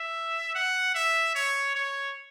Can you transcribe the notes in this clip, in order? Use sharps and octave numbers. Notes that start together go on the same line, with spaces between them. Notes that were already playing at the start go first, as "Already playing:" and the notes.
Already playing: E5
F#5
E5
C#5
C#5